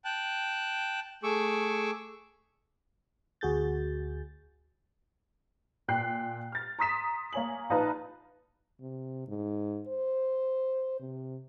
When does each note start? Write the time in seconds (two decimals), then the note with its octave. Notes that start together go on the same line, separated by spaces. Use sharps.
0.05 G5 A5 F#6
1.23 A3 G#4 C#6 D6 E6
3.41 D2 F#4 G#4 G6 A6
5.88 A#2 G5 F#6 C7
6.52 F6 A6
6.79 A#5 C6 D#6 B6 E7
7.33 A#3 C#5 G#5 F#7
7.70 A#1 D#4 F4 B4 A5
8.80 C3
9.28 G#2
9.88 C5
11.00 C3